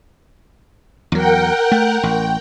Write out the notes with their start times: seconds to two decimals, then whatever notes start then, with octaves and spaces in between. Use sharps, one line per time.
1.12 E2 F#3 A#4 F#5 G5
1.72 A3
2.03 A1 G5